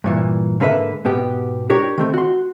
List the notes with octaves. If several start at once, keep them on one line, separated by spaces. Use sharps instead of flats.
G2 A#2 E3
G#2 D3 A#3 B4 C5 E5
G#2 B2 B3 G4
D4 G4 A#4 C#5
D#3 A3 C4
F#4 C6